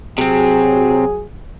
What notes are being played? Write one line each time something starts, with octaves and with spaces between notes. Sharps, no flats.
C3 F#3 C4 G#4